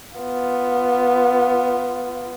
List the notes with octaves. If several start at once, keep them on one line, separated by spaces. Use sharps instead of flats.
B3 F4